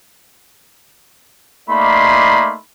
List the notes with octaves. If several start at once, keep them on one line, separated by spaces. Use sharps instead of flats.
A3 A#3 D#4 D5 B5 C6